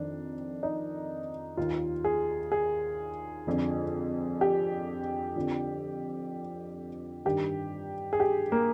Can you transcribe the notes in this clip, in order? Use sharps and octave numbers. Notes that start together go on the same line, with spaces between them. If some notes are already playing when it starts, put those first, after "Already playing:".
Already playing: F2 D#3 D4
D#4
D#2 D#3 F4
G#4
G#4
F2 D3 F3
G4
F2 D3 F3
G2 D#3 G4
G#4
G4
A#3